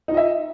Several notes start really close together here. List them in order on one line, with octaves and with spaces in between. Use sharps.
D#4 F4 D#5 E5